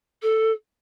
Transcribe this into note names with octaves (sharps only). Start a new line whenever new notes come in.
A4